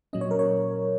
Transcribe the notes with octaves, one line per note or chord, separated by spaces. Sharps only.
A#2 F#3 C#4 D#5
C#5
A#4
C#5